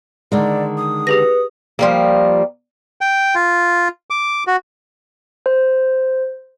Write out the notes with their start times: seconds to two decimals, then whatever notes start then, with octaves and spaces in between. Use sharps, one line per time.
0.32 D3 D#3 G#3 D5
0.77 D#6
1.07 G4 G#4 B4 A#6
1.79 F3 G3 A#3
3.01 G5
3.35 F4
4.10 D6
4.47 F#4
5.46 C5